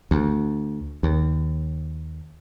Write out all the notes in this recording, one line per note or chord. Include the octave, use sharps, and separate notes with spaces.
D2
D#2